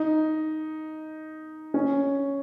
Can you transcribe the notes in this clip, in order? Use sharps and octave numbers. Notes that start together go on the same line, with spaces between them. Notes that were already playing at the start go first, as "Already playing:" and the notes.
Already playing: D#4
C#4